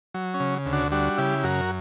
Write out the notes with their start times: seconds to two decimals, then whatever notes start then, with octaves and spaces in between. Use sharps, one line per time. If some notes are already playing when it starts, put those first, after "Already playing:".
0.14 F#3
0.34 C#4
0.40 C#3
0.66 D2
0.73 D4 F#4
0.92 G3 D4 F#4
1.18 C#3 E4 G4
1.43 F#2 F#4 A#4